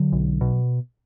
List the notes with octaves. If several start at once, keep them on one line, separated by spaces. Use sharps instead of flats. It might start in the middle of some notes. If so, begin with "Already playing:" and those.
Already playing: D3 F#3
B1
B2